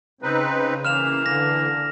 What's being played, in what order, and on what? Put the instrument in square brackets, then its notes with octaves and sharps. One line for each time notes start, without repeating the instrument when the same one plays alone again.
[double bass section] C#3 [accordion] C4 D#4 B4
[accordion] E3 A#3 [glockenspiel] F6 E7 F7
[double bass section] D3 [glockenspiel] A#6